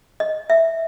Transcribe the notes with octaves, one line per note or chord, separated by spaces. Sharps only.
D#5
E5